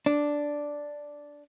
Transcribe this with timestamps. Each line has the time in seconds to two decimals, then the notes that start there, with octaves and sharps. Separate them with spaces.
0.06 D4